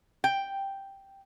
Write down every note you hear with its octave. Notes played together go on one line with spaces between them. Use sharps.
G5